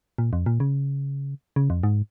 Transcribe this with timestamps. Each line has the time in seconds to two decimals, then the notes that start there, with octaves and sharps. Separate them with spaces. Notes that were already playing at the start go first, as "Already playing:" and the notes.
0.18 A#2
0.33 F2
0.46 A#2
0.60 C#3
1.56 C#3
1.70 F2
1.83 G#2